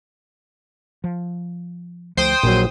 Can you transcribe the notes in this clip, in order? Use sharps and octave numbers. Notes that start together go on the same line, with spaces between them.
F3
D2 F3 A3 C5 G5 D#6
A#1 A#2 F#3